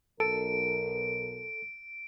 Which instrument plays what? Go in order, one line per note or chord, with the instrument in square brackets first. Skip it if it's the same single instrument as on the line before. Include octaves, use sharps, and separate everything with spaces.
[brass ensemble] B1 B2 A#4 [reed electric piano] A4 [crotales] D7